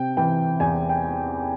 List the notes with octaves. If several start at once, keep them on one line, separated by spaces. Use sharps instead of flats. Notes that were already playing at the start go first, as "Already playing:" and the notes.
Already playing: C3 G5
E3 G5
E2 G#5
G5